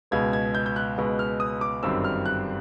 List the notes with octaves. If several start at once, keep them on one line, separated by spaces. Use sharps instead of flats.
C#2 B2 G#3 B3 G#6
G#6
G6
G6
F#6
C#2 B2 G#3 B3
F6
D#6
D6
G1 F#2 D#3 G3 C4 E6
F6
F#6